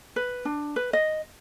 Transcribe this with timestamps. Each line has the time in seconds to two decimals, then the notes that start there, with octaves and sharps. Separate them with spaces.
0.16 B4
0.45 D4
0.76 B4
0.93 D#5